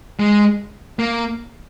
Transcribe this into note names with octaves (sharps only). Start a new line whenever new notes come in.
G#3
A#3